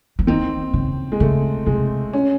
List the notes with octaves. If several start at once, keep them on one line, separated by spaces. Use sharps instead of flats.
E3
D#3 C4
C#3
G#3
C#3 A3
C3 G#3
C#4